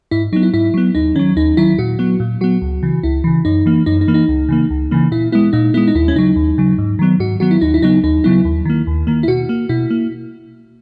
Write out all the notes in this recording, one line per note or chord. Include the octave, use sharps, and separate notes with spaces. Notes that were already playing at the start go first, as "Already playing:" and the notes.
G#2 E4
F#3 B3 D#4
E4
G#2 E4
F#3 B3
D#2 D#4
D#3 F#3 C#4
D#2 D#4
D#3 F#3 E4
A#2 F#4
F#3 B3
A#2
F#3 B3 F#4
C#2
C#3 E3
C#2 E4
C#3 E3
F#2 D#4
E3 A#3
F#2 D#4
D#4
E3 A#3
D#4
C#2
C#3 E3 A#3
C#2
C#3 E3 A#3
A#2 E4
G#3 B3 E4
A#2 D#4
G#3 B3 E4
D#4
D#2 E4
C#4
C#3 F#3 D#4
D#2
C#3 F#3
G#2
D#3 F#3 B3
G#2 F#4
D#3 F#3 B3 F#4
E4
D#2 D#4
E4
C#3 F#3 B3 D#4
D#2 D#4
C#3 F#3 B3 E4
D#2
D#3 A#3
D#2
D#3 A#3
E4
B2 F#4
A#3
B2 E4
A#3